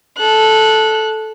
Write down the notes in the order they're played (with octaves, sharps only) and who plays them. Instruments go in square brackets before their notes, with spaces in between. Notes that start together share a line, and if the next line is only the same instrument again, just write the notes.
[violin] A4 F#6